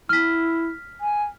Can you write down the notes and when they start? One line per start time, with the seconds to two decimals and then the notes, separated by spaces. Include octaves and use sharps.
0.09 E4 F6 B6
1.01 G#5